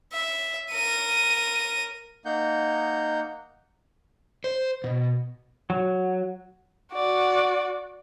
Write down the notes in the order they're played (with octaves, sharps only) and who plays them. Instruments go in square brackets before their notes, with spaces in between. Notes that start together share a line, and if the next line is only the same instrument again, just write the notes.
[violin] E5
A#4 D#7
[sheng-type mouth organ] A#3 D#4 F#5 G6
[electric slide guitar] C5
B2
[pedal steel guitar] F#3
[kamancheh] F#4 D5